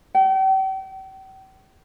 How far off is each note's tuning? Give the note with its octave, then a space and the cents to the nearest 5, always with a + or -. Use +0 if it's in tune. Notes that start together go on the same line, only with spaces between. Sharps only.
G5 -40